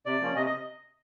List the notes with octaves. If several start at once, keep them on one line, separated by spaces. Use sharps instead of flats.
C3 D5
F3 A#3 C#4
C3 D#5
D#5